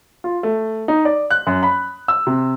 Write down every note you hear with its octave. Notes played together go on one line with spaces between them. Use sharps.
F4
A3
D#4
D5
F#6
F#2
B5
E6
C3